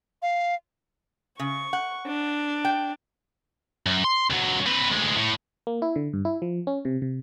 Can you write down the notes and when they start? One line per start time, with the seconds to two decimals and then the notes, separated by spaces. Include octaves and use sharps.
0.22 F5
1.40 C#3 C#6
1.73 F#5
2.07 D4
2.65 G5
3.86 F#2
4.04 C6
4.30 C#2 F#3
4.66 C4 B4
4.92 D2 G#3
5.16 A2
5.67 A#3
5.82 E4
5.96 D3
6.13 G2
6.25 E4
6.42 F3
6.67 C#4
6.85 C3
7.02 C3